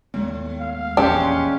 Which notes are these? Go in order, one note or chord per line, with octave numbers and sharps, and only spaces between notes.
D#2 A2 G#3 B3
F5
E1 A#1 E2 G#3 C#4 D4 G4